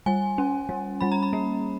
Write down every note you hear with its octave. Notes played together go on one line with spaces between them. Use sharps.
G3 G#5
C#4
G3
G3 B5
A#5
B5
A#3